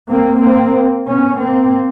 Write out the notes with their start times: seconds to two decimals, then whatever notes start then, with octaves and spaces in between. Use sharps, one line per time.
0.09 A#3 C4
0.41 A#3 C4
1.07 B3 C#4
1.40 A#3 C4